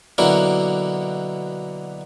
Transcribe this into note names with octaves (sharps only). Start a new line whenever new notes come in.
B2 D3 F#3 A#3 E4 A#4